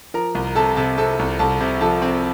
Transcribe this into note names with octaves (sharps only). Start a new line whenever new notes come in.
F3 A#4 A#5
C2
C3 A4 A5
C3 A4 A5
C3 A4 A5
C2
C2 A4 A5
C3
F3 A4 A5
C4